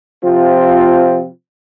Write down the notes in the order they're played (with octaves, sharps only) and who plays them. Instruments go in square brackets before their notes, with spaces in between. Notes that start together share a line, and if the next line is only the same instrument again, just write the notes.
[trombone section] C3 F3 C4 F4